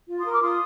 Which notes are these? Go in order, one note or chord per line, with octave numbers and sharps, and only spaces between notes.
F4
C6 D#6
A#4
D6 F6
F4 C6 D#6